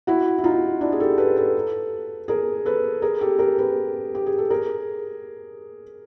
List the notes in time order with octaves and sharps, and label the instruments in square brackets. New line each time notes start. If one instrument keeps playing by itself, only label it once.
[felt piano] E4 F#4
E4
D#4 F4
D4 E4
G#4
G4 A4
A4 B4
A4 B4
G#4 A#4
A4 B4
G#4 A#4
G4 A4
G#4 A#4
A4 B4
G4
G#4
A4
G#4 A#4